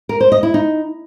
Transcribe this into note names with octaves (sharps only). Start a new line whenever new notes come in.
A#4
C5
D#5
E4
D#4